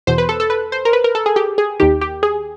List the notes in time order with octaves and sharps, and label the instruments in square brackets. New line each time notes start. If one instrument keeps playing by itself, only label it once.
[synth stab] E2 B2 C5
B4
A4
A4
B4
C5
A#4
B4
A#4
A4
G#4
G4
G#4
D#2 D#3 G4
G4
G#4